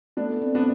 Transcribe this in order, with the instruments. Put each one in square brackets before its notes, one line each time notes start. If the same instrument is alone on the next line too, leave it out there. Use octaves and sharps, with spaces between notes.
[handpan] A3 [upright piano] B3 D4
[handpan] C4
[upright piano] B3 D4